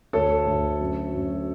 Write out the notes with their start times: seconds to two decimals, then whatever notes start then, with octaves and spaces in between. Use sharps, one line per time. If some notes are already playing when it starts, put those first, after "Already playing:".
0.13 D2 A4 C#5
0.46 D2
0.81 F#2
1.14 F#2